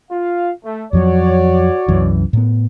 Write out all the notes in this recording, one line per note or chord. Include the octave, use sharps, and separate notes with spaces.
F4 F5
A3
F2 F3 F#3 F#4 C#5 D5
C2 F#2 E3
A2 B3